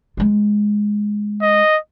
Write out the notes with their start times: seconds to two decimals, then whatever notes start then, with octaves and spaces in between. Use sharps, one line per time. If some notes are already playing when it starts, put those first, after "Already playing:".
0.17 G#3 B3
1.42 D#5